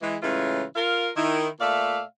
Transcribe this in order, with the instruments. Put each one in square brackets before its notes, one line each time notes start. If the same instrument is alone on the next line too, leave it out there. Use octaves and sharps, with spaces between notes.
[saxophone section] E3 G#3
A2 C#3 E3 G#3 C#4 F4
F4 A#4 F5
D#3 E4
A#2 A3 D5 E5 F5